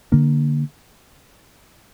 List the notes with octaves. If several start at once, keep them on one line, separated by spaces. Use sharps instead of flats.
D3 A#3 D4